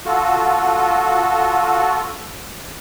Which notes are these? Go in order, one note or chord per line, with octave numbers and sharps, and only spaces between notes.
F4 F#4 A4